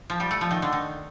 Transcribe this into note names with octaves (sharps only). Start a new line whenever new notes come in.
F3
G3
A3
F3
D#3
D3
D#3